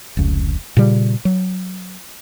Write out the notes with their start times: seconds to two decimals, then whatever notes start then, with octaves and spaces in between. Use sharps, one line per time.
0.17 F1 C#2
0.77 A#2 C#3 G3
1.25 F#3